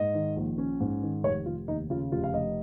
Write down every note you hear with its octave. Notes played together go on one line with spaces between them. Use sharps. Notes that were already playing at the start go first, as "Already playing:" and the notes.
Already playing: G#2 D#5
D#3
A#1
C#4
G#2
D#3
F1 C#5
F1 F4
D#2 D#4
C#3 F4
F1 F4
F5
F1 D#5